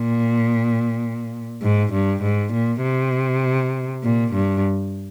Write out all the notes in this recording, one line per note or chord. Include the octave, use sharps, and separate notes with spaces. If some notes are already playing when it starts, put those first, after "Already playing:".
Already playing: A#2
G#2
G2
G#2
A#2
C3
A#2
G2